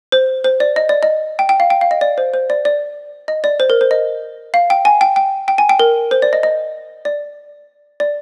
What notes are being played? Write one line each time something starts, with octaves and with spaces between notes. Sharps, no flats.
C5
C5
D5
D#5
D5
D#5
G5
G5
F5
G5
F5
D#5
D5
C5
C5
D5
D5
D#5
D5
C5
A#4
C5
D#5
F5
G5
G#5
G5
G5
G5
G#5
G5
A#4
C5
D5
D#5
D#5
D5
D5